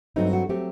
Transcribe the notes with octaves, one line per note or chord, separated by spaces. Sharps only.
G2 F#3 A3 C4 D#4
F#4
F#3 A3 C4 G4